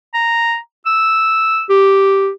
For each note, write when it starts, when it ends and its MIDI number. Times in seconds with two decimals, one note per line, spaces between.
0.14 0.58 82
0.86 1.64 88
1.70 2.30 67